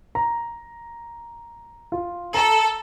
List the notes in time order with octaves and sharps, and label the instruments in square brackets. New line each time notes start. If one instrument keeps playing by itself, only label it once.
[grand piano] A#5
F4
[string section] A4 [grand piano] A#5